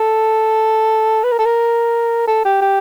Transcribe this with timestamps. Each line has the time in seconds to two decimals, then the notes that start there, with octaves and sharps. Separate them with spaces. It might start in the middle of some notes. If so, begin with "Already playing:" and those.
Already playing: A4
1.23 B4
1.32 A#4
1.39 A4
1.45 A#4
2.27 A4
2.45 G4
2.61 G4